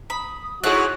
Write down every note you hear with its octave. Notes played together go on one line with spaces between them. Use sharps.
B5 D#6
G#2 E4 F#4 G#4 C#5 F#6